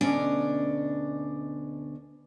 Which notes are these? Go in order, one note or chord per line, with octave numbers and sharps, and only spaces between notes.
D2 B2 C#4 D4 D5 D#5